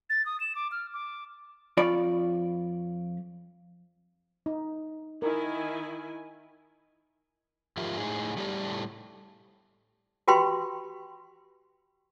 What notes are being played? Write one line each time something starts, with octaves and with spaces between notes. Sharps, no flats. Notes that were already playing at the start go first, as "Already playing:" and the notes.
A6
D#6
E7
D6
F6
D6
F2 F4 C#5 D5 B5
D#4
D#3 E4 A#4 G#5
G#2 F3 F4 G4 A#4 E5
A2 D#4 G#4
A2 G3 A3 G4 A4 D5
F#4 G4 B4 G5 B5 C6